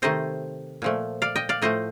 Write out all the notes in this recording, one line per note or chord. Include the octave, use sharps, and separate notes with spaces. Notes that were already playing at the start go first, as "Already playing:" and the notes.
C3 D#3 A3 C5 D#5
A#2 F3 A3
D5 F5
D#5 G5
D5 F5
A2 F3 A3 C5 D#5